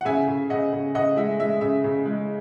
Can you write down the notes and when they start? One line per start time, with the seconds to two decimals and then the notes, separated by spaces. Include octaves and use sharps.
0.01 F#5
0.05 C#3 E5 G#5
0.28 C#3
0.50 C#3 D#5 F#5
0.73 C#3
0.95 C#3 D#5 F#5
1.17 G#3 E5
1.40 G#3 E5
1.61 C#3 E5
1.84 C#3
2.06 G#3